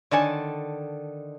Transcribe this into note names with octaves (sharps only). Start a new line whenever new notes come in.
D3 D#3 C#5 D5 G#5 A5